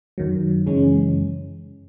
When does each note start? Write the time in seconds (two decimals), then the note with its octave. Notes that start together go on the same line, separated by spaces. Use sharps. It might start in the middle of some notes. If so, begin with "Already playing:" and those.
0.18 F#2 D#3 F#3
0.66 F#2 C#3 E3 G#3 C#4